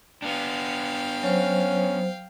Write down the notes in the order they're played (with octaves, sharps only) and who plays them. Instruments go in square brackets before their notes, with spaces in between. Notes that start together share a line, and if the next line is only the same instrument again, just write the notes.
[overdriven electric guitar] B3 D4 [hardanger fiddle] F5 G5
[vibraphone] F#3 C5 [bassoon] C#4